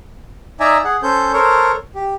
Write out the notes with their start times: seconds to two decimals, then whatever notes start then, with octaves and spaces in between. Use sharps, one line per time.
0.60 D#4 D5 E5 G#5 A#5
0.85 G#4 F#5
1.03 C#4 A4 C5 G6
1.33 A4 A#4 C5 C#5
1.95 G4